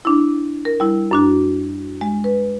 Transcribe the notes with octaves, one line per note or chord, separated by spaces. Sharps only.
D4 E4
A#4
G3 E4
F#2 D4 F#4
G#3
B4